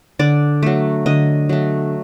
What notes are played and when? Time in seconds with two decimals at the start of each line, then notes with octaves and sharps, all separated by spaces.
0.19 D3 D5
0.63 F#3 A3
1.06 D3 D#5
1.49 F#3 A3